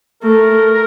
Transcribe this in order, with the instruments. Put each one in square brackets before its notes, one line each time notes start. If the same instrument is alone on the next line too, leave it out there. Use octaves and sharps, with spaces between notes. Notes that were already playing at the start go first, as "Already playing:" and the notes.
[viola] A3 [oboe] A#4